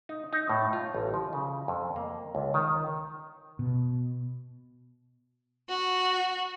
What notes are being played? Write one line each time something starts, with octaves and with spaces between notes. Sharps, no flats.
D#4
D#4
A2
F4
A1
F3
C#3
F2
A#3
C#2
D#3
B2
F#4